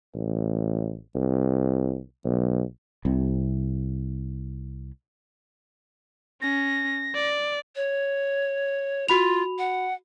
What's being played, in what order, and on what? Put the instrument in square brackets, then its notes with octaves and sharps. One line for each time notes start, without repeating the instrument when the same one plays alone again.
[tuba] A1
C2
B1
[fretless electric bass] C2 C3
[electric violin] C#4 [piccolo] A#6
[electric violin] D5
[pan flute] C#5
[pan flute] F4 [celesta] F#4 B5 F7
[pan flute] F#5